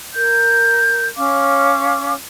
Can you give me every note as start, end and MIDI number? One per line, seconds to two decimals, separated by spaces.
0.14 1.06 70
0.14 1.06 91
1.17 2.14 61
1.17 2.14 73
1.17 2.14 77
1.17 2.14 86